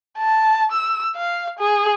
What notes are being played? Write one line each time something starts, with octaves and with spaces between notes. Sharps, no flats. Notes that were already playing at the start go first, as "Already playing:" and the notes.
A5
E6
F5
G#4